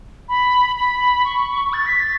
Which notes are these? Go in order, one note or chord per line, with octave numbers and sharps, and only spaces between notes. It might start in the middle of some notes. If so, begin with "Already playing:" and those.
B5
B5
C#6
A6
B6
A6